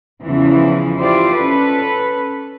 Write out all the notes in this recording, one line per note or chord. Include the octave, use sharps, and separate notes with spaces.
E2 C#3 E3 F3 C#4
E4 F4 G4 C5 D5
C#4 A4 B4